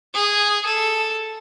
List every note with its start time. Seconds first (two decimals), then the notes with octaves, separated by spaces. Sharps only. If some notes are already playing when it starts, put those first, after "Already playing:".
0.14 G#4
0.66 A4